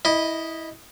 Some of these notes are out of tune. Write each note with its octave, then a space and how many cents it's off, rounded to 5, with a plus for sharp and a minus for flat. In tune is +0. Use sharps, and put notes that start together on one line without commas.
E4 -15 D#5 +0